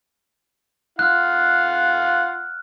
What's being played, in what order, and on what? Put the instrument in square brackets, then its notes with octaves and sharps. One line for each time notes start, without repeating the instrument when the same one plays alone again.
[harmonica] F4 F5 F#5 [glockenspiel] F6 F#6